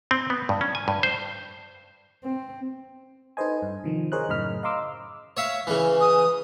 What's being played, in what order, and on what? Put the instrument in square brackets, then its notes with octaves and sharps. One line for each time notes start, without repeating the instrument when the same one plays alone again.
[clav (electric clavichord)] C4
B3
G2
C#4
G#5
G2
C5
[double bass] C4
[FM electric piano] D#4 A4 B4 C5 D#5 G#5
G2
C3 D#3 F3
G#4 A#4 C5 C#5 D#5 F#6
F#2 A2 C#3 D#5 B5 F6
D#5 F5 A#5 C6 D6 E6
[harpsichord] C#5 E5 F5
C#3 E3
[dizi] D#6